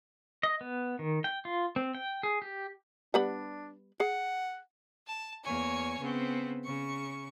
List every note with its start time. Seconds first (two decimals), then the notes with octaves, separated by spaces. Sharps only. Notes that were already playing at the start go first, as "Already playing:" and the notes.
0.43 D#5
0.61 B3
0.99 D#3
1.24 G5
1.45 F4
1.76 C4
1.95 G5
2.23 G#4
2.42 G4
3.14 G3 B3 D4 B5
4.00 G#4 F#5
5.07 A5
5.43 E2 A#3 C#5 G#5 C#6
5.98 C#3 B3 C4
6.63 C#3 C#6